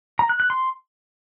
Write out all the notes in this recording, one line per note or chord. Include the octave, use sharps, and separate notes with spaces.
A#5
F#6
F#6
C6